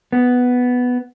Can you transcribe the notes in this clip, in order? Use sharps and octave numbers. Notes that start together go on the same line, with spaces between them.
B3